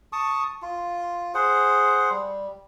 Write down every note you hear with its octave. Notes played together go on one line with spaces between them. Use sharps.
A5 C#6 D#6
F4
G#4 C5 F#5
G3